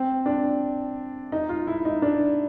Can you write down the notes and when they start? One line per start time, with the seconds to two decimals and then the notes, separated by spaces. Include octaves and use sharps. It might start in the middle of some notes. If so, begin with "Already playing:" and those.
Already playing: C4
0.26 D4
1.32 D#4
1.49 F4
1.67 E4
1.85 D#4
2.02 D4